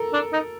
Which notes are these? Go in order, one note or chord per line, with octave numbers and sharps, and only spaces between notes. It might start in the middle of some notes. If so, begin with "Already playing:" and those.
Already playing: A4 A#4
D4
D#4